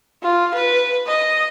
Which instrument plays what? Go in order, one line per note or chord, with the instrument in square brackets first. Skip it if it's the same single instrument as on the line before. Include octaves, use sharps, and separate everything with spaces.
[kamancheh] F4
B4
D#5